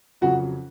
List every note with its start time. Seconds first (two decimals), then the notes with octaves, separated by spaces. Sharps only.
0.21 F2 C#3 F#3 F#4